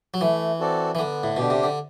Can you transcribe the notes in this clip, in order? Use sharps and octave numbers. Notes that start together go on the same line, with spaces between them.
F#3
E3 A3
C4 F#4 A4 D5
E3
D3 B3
A2
B2 D4 G4
C3
D3